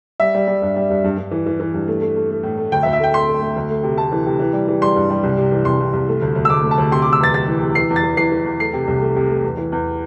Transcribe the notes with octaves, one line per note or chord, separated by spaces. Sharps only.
G3 E5
G3
G3
G2
G3
G2
G2
G2
E3
E3
E3
G2
A3
A3
A3
A3
A2
A3
D2 G5
E5
D2
E5
A3 G5
A3 C6
A3
A3
D2
A3
C3
A3 A5
E3
C3
E3
G3
E3
G3 C6
G2
G3
C2
C3
E3
C2 C6
C2
C2
A3
D2
D2
E6
D2 D6
A3
A5
D2
C3 C6
C3 D6
E6
E2 A6
C3 A6
E3
C3
E3 C7
E2
A6
E2
E3 C7
E3
E2
A3 C7
C3
C2
A3
C3
A3
E2
E3
E2